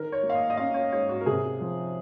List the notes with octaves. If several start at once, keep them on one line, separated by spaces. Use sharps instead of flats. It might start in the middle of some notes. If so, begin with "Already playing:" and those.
Already playing: D#3 A#4
C#5
A#3
F5
D#5
D#5
C#4 F5
C#5
G#2 C#5
F#4
A#4
C3 G#4
F3